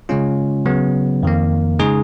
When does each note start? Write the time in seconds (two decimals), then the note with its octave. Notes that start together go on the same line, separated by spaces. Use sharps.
0.09 C#3 G#3 C#4 F4
0.66 C#3 F#3 B3
1.23 F2 D#3 A#3
1.79 C#3 G#3 D#4 G#4